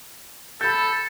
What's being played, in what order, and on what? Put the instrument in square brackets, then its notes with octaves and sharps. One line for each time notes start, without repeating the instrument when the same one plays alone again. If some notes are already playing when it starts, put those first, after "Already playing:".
[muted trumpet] A4 [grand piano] B5 G6